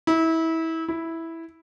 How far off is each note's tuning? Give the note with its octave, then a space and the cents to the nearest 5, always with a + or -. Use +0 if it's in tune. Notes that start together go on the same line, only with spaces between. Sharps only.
E4 -25
E4 -5